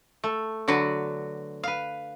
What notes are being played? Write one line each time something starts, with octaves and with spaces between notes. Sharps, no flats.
A3
D3 F#3 F#4 B4
B4 F5